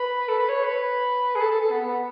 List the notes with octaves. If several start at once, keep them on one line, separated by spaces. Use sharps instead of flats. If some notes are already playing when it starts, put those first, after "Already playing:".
Already playing: B4
A4
B4
C#5
B4
G#4
A4
A4
A4
B3
B3